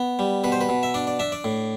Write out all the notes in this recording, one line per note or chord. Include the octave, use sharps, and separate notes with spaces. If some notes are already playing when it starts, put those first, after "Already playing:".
Already playing: B3
G3
B2 B4
C5
B4
B2
E5
D4 D5
D5
D4 E5
D5
A2